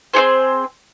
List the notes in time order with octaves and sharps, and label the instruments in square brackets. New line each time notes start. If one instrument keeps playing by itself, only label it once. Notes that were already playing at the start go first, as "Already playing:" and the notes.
[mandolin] C4 D#4 G#4 C5